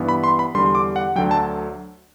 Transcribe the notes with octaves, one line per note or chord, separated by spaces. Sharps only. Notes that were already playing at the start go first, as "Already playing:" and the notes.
Already playing: G2 E3 B3
B5
C6
B5
E2 D3 G3 C6
C6
D6
F#5
D2 D3 F#3 G5
A5